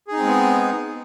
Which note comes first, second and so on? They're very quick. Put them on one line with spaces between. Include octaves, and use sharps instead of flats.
G#4 D#4 C4 G#3 B3